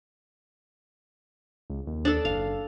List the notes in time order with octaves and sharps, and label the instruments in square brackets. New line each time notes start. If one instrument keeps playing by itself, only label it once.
[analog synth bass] C#2
D#2
[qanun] D4 A4
[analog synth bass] F#1 [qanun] F5